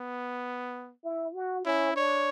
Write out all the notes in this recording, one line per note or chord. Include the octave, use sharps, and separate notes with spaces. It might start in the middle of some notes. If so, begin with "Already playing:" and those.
Already playing: B3
E4
F#4
C#4 E4
D4 C#5